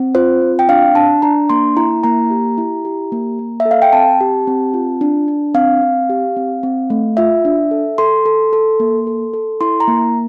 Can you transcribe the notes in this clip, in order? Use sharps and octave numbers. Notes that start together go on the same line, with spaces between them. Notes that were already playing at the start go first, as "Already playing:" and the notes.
Already playing: C4
F4 C5
C4
G5
D4 F5
D4 A5
D4 A#5
A#3 C6
E4 A#5
A#3 A#5
G4
E4
G4
A#3
A#3
E5
A4
F5
G5
C4 A5
G4
C4
F4
D4
D4
C4 F5
C4
G4
C4
C4
A3
F4 E5
D4
A4
A4 C6
A4
A4
A#3
A4
A4
E4 C6
A#5
A#3